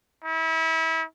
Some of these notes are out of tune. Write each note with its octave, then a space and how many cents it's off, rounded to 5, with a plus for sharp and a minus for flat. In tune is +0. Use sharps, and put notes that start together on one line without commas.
E4 -30